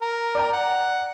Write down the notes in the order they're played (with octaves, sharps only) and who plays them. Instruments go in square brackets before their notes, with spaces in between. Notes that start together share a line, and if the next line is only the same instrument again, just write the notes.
[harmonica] A#4
[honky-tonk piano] D5 G5 A#5
[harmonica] F#5